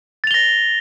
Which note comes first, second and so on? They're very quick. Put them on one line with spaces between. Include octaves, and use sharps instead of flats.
A6 F7 G7 A#6